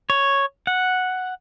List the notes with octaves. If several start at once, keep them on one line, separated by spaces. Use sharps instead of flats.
C#5
F#5